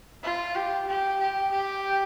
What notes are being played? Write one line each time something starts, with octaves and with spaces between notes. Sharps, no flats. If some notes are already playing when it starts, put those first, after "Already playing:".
F4
G4
G4
G4
G4